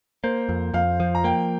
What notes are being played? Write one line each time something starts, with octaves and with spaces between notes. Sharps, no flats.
A#3 C5
F2
F2 F5
F3
A#5
A#3 G5